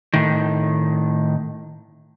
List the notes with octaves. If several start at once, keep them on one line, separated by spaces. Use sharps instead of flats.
A2 D#3